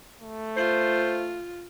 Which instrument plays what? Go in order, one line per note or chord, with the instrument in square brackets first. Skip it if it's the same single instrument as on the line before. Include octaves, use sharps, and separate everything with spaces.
[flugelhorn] A3
[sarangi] F4 [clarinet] C5